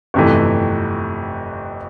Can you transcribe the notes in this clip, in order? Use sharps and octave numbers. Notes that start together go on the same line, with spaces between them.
G1 F2 C3 E3 A3